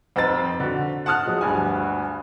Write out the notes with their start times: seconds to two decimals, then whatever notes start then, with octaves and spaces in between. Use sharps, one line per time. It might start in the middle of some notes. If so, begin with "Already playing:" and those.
0.16 F2 C4 D#4 B4 A#5 A6
0.60 D3 F#4
1.06 F#5 A5 D#6 F6 F#6
1.26 F3 F#3 G#3
1.41 D2 G2 G#5